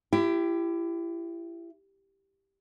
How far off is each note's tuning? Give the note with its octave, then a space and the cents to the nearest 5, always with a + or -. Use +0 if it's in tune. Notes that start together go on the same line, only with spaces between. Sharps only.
E4 +30 G4 +0